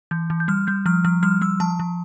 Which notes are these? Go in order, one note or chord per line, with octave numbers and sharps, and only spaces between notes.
E3 G6
E3
G6
G3 F6
G3 G6
F3 F6
F3 F6
G3 F6
G3 E6
F3 A5
F3